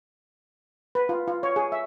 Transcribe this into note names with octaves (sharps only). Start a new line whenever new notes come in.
B4
F4
F4
C#5
G#4
E5